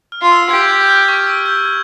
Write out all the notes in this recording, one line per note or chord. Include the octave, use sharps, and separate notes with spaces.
F6
F4
E6
G4 G#6
G6
F6
C#6
E6
G6
G#6